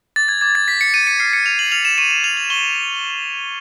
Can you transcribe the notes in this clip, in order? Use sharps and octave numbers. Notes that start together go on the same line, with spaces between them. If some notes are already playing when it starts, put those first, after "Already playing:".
D6 A6
G#6
D6 G#6
A6
G6 B6
C#7
G6 D#7
C#7
F6 C7
C#7
F6 F7
F#7
F6 F7
E7
C#6 D#7
E7
F6 F7
F#7
C#6 G7